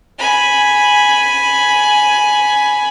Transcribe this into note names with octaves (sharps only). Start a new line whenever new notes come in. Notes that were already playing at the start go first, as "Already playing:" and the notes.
G#5 B5